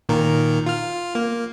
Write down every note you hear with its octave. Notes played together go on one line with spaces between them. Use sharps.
A#2 D#3 A#4
F4 F6
A#3